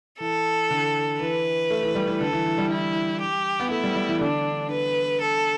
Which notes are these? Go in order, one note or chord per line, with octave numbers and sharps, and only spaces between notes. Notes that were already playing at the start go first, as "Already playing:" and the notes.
E3 A4
D3
E3 B4
A3
E3
G3
E3
D3 A4
E3
E3
G3
E4
G4
B3
A3 E4
G3
G3
E3
D3 D4
B4
A4